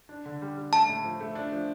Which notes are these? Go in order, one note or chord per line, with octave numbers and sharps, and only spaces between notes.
D4
D3
G3
G3
A3 A5
A2
F3
A3
D4
F3